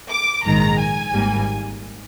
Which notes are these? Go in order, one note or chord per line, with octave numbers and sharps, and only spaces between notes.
D6
A#1 G#2 D#3 G#3 A#5
G#5
G#1 G#2 G3 A#3